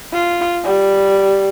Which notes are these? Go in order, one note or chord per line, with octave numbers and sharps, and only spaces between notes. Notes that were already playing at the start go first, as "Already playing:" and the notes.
F4
G3